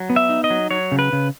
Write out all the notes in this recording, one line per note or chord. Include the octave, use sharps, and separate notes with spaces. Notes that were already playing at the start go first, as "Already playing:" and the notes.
Already playing: F#3
B3
E5
D#4
D#5
F#3
F#3 C#5
C#3
B4
C#3